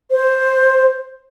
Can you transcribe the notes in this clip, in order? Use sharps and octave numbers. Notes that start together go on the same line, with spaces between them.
C5